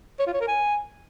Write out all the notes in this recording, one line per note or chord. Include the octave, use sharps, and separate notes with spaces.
C#5
F4
C#5
A#4
G#5